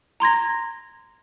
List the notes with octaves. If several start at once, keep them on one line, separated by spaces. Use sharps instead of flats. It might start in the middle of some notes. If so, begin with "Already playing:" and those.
A#5 C6 G#6 A#6